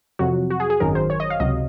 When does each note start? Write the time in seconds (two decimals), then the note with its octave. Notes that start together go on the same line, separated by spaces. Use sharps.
0.19 F2 C3 F#3 F#4
0.50 F#4
0.60 G#4
0.70 G#4
0.80 G#1 F#2 D#3 F#3 A#4
0.95 C5
1.10 C#5
1.20 D#5
1.30 F5
1.40 C#2 C3 F#3 D#5